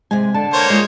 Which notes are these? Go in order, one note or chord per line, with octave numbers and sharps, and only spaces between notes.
C3 G#3 G#5
D3 A5
A#3 C5 C#5
G#3 F4 G#4